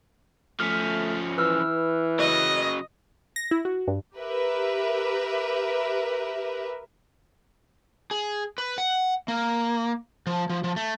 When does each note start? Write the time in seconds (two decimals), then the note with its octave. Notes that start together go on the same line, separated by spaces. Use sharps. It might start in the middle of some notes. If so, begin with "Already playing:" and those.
0.60 F3 A3 C#4 F6 B6
1.38 E3 B4 E6 F6
2.19 C#3 F#3 D#5
3.36 A#6
3.51 E4
3.65 F#4
3.88 G2
4.16 G4 A#4 B4 E5
8.11 G#4
8.58 B4
8.78 F#5
9.28 A#3
10.27 F3
10.50 F3
10.64 F3
10.76 A3